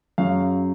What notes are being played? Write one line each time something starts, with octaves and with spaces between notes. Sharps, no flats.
F#2 C#3 F#3 F5